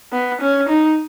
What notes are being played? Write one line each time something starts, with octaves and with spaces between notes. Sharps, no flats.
B3
C#4
D#4